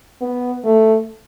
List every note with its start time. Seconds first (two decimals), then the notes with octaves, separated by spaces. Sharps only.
0.21 B3
0.64 A3